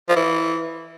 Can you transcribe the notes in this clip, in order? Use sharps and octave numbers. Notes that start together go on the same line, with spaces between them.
F3
E3